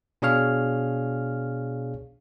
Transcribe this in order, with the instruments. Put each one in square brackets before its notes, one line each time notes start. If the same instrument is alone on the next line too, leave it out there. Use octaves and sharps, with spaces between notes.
[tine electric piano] B2 D4 G#4 C#5 F5 F6